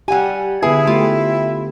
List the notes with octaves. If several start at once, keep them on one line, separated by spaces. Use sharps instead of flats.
G3 G4 F#5 G#5
D3 B3 E4 G#4 B4
A3 F4 G4